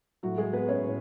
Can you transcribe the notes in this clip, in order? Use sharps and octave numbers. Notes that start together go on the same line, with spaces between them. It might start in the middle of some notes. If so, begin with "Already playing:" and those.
A2 F#3 A3 F#4
G#3 G#4
B3 B4
C#4 C#5
A2